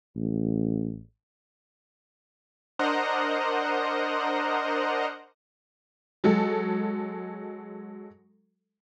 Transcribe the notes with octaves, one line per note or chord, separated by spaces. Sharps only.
A1
D4 A#4 C5 D#5 F#5 A#5
F#3 G#3 A4